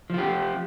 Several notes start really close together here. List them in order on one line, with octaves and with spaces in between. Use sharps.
F3 F4 G4 C4